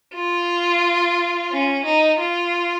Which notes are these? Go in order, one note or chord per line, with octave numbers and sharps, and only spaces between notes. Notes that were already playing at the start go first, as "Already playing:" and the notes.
F4
C#4
D#4
F4